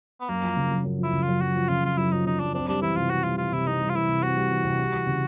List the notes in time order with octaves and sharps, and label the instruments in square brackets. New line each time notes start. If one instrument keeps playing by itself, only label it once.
[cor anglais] B3
[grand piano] F#2 [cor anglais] A#3
[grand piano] F3
C#3
F#2
F#2
[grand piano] F3 [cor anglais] E4
[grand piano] C#3
[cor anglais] F4
[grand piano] F#2
[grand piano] F#2 [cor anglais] F#4
[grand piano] F3
[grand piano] C#3 [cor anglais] F4
[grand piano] F#2 [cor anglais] F4
[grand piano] F#2 [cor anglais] E4
[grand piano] F3 [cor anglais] D#4
[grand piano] C#3 [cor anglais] D#4
[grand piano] F#2 [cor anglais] D4
[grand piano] C4 [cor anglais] D4
[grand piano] G3 [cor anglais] D4
[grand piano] E3 [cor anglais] E4
[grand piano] C3 [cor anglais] F4
[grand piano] C4 [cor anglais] F#4
[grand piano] G3 [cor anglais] F4
[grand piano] E3 [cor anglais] F4
[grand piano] C3 [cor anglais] E4
[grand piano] C4 [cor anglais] D#4
[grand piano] G3
[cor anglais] F4
[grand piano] E3 [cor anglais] E4
[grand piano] C3
[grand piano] C4 [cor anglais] F#4
[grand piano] G3
E3
C3
G3
E3
C#3